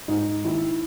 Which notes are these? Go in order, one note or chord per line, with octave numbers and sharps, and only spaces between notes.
G#2 D#4
D#3 E4